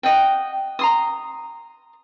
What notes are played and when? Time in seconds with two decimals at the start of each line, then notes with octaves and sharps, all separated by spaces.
0.03 D#5 F#5 G5
0.79 A#5 C6 D#6